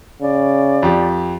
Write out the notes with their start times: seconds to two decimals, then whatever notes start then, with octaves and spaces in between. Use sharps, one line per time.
0.22 C#3 D5
0.83 F2 G4